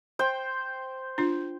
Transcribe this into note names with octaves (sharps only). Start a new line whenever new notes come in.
C5 G5
D4 F4